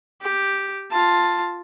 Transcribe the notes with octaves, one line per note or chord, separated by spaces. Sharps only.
G4
F4 A5